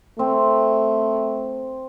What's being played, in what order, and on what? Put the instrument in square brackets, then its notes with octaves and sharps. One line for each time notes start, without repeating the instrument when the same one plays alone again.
[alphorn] A3 [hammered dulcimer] C4